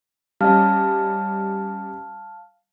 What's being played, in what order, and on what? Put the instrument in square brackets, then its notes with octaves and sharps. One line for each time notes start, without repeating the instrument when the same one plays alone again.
[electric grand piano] G3 C#4 D#5 [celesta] F5 A5 F6